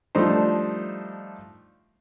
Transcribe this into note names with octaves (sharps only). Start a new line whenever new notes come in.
F3 G3 A3 D4 D#4 C5